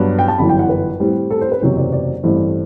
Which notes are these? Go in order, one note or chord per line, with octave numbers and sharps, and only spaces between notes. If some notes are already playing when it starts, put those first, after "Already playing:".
Already playing: G2 F#3 B3 D4
G5
A5
G1 F#2 E3 B5
G5
F#5
B4
A2 G3 C4
A4
C5
B4
F#1 E2 C3 F#3 C4 C5
D5
D5
A1 G2 E3 A3 C4